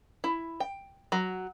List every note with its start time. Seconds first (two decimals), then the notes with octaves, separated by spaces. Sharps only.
0.24 E4
0.60 G5
1.12 F#3